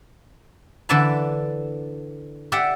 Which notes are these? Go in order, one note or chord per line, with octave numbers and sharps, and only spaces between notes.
D3 E3 D5 E5 A5 B5
G4 D5 E5 F#5 G5